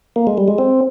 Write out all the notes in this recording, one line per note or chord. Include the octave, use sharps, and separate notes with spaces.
A#3
G#3
G3
G#3
C4